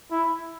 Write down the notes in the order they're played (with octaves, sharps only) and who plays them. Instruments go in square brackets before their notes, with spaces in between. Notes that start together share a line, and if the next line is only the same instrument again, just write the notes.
[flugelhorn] E4